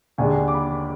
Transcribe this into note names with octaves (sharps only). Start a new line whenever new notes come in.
D#2 D3 G#3 D4 G#5
D6
B5